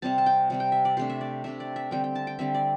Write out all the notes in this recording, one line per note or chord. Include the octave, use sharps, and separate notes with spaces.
C3 G3 C4 A5
A5
G5
C3 G3 C4
G5
E5
D5
C3 A3 D4 C5
E5
D5
C3 A3 D4 E5
D5
E5
D3 G3 C4 G5
G5
A5
G5
D3 G3 C4 E5
D5